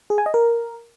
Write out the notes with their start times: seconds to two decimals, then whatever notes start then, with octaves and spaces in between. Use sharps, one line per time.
0.10 G#4
0.18 G#5
0.26 D#5
0.34 A#4